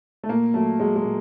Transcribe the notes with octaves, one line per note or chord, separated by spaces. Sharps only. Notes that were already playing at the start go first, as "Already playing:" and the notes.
A3
A#2 A#3
F#3 A3
F#3 G#3
G#3
A#2